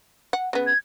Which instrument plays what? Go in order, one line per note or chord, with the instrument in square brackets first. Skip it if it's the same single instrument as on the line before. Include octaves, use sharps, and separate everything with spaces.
[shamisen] F#5
C#3 B3
[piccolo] G#6